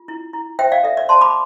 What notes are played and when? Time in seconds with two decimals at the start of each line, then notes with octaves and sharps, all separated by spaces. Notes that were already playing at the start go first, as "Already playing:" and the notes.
Already playing: F4
0.08 E4
0.33 E4
0.59 C5 E5 G5
0.72 D5 F5
0.84 A4 E5
0.97 D5
1.09 C5 A5 C6
1.21 B5 D6